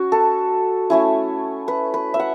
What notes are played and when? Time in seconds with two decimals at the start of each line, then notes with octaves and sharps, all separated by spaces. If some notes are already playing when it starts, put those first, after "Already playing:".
Already playing: C#4 F#4
0.12 A4
0.90 A3 C#4 E4
1.68 B4
1.94 B4
2.14 E5
2.20 F#5